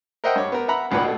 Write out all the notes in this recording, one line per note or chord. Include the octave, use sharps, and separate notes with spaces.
A#4 C5 D#5 E5 F#5 G5
G2 C#5 D6
B3 A#4
E5 F#5 A#5 B5
G#1 C#2 A#2 B4 F#5 B5
B2 A3